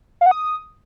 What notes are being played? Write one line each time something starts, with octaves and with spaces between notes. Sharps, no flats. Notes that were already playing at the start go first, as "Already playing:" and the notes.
F5
F#5
D#6